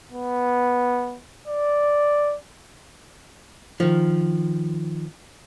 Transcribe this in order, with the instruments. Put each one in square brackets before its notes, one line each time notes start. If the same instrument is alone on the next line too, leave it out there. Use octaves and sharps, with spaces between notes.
[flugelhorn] B3
D5
[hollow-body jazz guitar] D#3 F3